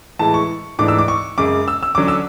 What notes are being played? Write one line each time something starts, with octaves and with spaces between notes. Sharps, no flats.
A2 E3 G#3 A5
C#6
G#2 E3 A3 D4 D6
E6
D6
C#6
F#2 C#3 G#3 D6
E6
E6
D3 F#3 C#4 D6
E6